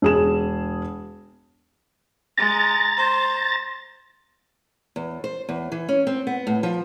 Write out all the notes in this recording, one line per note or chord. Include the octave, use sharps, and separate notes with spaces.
E1 G#4 E7
G#3 A#5 A6
C5
E2
C5
E2
E3
C#4
C4
B3
A2
F3